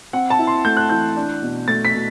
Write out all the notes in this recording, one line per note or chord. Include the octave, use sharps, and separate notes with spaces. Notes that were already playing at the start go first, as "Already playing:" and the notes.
C4 F#5
A5
E4
C6
A3 G6
F#6
E3 G6
D4
B2
A3 A6
B6
B2